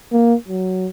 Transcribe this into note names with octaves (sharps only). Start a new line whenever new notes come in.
A#3
F#3